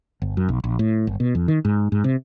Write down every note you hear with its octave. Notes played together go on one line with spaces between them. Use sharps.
G1
F#2
B1
A#1
A2
G1
B2
F2
D#3
G#2
G#2
C3